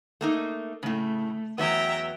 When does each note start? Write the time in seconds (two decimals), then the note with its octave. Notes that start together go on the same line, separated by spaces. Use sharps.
0.21 A3 A#3 D#4
0.83 A2 C#3 A3
1.58 E2 F#3 B3 E5 G5 A#5